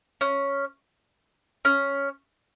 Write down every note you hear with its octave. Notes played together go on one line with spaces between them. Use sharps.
C#4
C#4